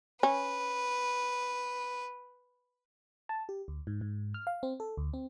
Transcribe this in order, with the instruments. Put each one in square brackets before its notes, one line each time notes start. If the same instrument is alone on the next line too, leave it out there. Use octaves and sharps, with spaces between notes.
[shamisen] C#4 [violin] B4
[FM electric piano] A5
G4
D2
G#2
G#2
F6
F5
C4
A4
D2
C4